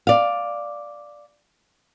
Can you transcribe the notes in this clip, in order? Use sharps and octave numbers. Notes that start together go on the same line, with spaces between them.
D5 F5